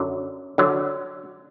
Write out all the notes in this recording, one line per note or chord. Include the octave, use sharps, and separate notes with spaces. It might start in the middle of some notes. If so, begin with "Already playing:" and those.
Already playing: F#2 D3 F#3
D3 F#3